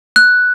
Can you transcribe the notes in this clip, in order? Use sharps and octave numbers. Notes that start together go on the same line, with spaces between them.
F#6